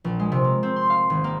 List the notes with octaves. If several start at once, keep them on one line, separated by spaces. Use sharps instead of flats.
A#1
G#3
C3
A#3
C4
C6
F5
G#1
A#3